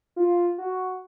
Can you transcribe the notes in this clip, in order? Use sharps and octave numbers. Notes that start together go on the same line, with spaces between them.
F4
F#4